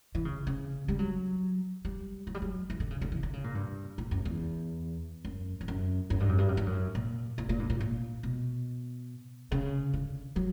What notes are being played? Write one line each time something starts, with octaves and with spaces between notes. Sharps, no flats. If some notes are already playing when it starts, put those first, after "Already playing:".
E3
C#3
C#3
G3
F#3
G3
F#3
G3
F#3
E3
D3
C#3
D3
E3
D3
C#3
A#2
G2
A#2
F#2
E2
F#2
E2
F#2
F#2
G2
F#2
G2
F#2
G2
F#2
A#2
A#2
A#2
G2
A#2
A#2
B2
C#3
D3
F#3